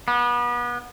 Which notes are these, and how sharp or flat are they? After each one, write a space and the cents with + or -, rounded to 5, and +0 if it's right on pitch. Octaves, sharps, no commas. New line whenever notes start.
B3 -30